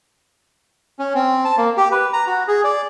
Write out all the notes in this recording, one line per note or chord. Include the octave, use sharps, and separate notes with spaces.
C#4
C4
A5
A#3
G4
B4
A#5
F#4
G#4
D5